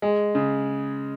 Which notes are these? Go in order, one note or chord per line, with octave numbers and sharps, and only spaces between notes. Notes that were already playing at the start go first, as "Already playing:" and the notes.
G#3
C#3